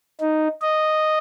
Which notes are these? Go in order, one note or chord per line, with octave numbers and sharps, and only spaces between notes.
D#4
D#5